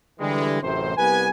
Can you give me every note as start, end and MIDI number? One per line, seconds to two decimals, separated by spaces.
0.20 0.62 50
0.20 0.62 52
0.20 0.62 55
0.20 0.62 56
0.62 0.96 33
0.62 0.96 42
0.62 0.96 48
0.62 0.96 72
0.98 1.29 36
0.98 1.29 55
0.98 1.29 59
0.98 1.29 71
0.98 1.29 80